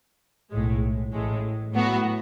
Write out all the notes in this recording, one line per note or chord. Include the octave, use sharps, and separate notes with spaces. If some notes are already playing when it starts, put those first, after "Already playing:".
B1 A2 G#3
A1 A2 G#3
A2 F#3 B3 F#4